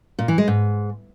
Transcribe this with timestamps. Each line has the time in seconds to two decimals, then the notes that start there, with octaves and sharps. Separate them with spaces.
0.19 A#2
0.28 E3
0.38 G#3
0.48 G#2